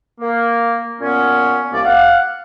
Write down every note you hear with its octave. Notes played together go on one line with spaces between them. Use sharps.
A#3
A#2 B3 C#4
C2 A#3 D5
F5 F#5